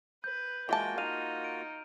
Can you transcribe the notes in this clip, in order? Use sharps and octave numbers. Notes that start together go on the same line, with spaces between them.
B4 G6
E3 G#3 A#3 F4 F#4 E5 G5 A5
D#4 F5 F6 D#7 F7
D7